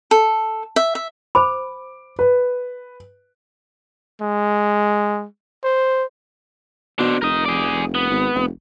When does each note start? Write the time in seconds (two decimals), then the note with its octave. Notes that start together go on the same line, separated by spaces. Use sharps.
0.11 A4
0.76 E5
0.95 E5
1.35 C5 B5 D6
2.19 B4
4.21 G#3
5.64 C5
6.99 B2 D4 C5
7.22 F1 A#4 D#5
7.45 G#4 D5
7.95 B3
8.09 G#1
8.35 F1